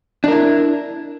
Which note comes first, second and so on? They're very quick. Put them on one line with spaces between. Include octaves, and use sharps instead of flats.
D4 A#4 E4